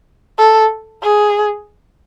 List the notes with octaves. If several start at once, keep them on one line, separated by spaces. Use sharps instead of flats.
A4
G#4